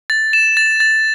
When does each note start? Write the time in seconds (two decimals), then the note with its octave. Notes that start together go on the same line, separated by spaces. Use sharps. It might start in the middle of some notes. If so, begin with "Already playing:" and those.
0.10 A6
0.33 E7
0.57 A6
0.80 A6